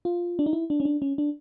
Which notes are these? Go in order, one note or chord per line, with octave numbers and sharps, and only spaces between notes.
F4
D4
D#4
E4
D4
C#4
D4
C#4
D4